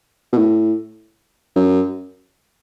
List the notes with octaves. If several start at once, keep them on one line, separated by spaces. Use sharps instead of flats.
B2
A2
F#2